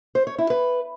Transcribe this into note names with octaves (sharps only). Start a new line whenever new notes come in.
C5
C#5
E4
B4